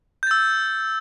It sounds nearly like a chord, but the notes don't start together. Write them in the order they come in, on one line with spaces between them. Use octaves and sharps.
G6 A6 E6